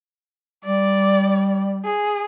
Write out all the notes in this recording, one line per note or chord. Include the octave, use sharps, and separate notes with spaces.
G3 D5
G#4